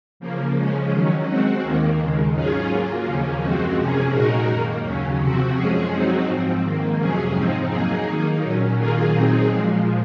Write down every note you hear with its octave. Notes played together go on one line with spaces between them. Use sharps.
C#3 F3 A#3
C#3 F3 G#3 C#4
D#3 F#3 C#4
G#3 C4 F#4
D#2 D#3 A#3
D#2 C#3 G#3
G#2 F#3 C#4 F4 G#4
F#3 A#3 F4
D#2 C#3 F3 A#3 C#4
F#2 F3 G#3 C4 F#4
C3 F3 A#3 C#4 G#4
A#2 G#3 D#4 F#4 A#4
F#2 D#3 A#3
D#2 C#3 F#3 C#4
C3 F3 C4 F#4
F#2 F3 G#3 C#4 G#4
F#3 C4 D#4 F#4
G#2 F3 C4
G#2 D#3 A#3
F2 C3 F#3 C#4 G#4
G#2 F3 C4 D#4
F#3 A#3 D#4 G#4
D#3 A#3 D#4
A#2 F#3 C#4
D#3 F#3 A#3 F4 G#4
A#2 F#3 C4 D#4 G#4
A#2 F3 G#3